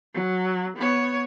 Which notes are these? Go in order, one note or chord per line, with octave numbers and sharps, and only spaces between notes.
F#3
B3 C#5